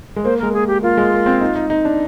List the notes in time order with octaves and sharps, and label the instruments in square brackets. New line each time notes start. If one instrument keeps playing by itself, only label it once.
[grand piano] G#3
[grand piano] A#3 [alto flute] C5
[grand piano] G#3 [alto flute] A#4
[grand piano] A#3 [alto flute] G#4
[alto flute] G4
[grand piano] A#3 [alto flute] F4
[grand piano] G#3
A#3
C4
D#4
D#4
D#4
D4